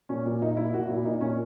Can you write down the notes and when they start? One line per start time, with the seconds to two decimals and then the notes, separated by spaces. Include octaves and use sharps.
0.09 A#2 C#4
0.26 A#2
0.42 A#2 D#4
0.57 A#2 E4
0.74 A#2 F#4
0.89 A#2 E4
1.05 A#2 D#4
1.21 A#2 C#4